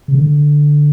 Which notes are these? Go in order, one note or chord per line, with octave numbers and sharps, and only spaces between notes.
C#3
D3